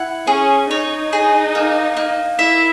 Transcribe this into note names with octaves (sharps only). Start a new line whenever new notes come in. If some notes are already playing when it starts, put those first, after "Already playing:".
Already playing: E4 F#5
C#4 G#4
D#4 C#5
G#4
A#3
A#3
E4 E5